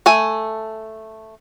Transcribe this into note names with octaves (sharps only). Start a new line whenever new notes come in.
A3 A4 G#5